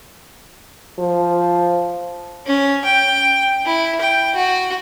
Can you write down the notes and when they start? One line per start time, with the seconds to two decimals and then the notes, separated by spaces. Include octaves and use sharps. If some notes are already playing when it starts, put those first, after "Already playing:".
0.99 F3
2.46 C#4
2.84 G5
3.65 E4
4.01 G5
4.35 F#4